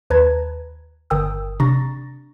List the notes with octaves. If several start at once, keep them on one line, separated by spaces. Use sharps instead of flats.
D#2 B4 A5 A#5 G#6
G1 A#4 G5 D#6 E6
C3 D4 A#5 C#6 A6 A#6